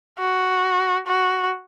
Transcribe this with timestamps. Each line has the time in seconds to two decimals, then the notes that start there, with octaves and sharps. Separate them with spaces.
0.19 F#4
1.07 F#4